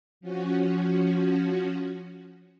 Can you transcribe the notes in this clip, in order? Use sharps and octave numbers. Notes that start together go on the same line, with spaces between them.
F3 C#4 F#4